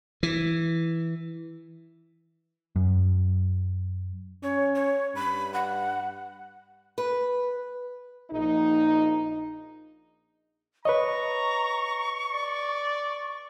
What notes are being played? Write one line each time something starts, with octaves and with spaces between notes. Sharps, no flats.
E3
F#2
C#4 C#5
C#5
G2 B5
F#5
B4
A#1 D#4
B4 C#5 D#5 A#5 C#6
D5